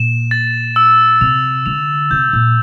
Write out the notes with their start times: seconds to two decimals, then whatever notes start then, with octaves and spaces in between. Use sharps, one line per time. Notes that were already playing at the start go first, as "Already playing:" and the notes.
Already playing: A#2 E7
0.31 A6
0.76 E6
1.21 C3 F7
1.66 D3 F7
2.11 C3 G6
2.33 A#2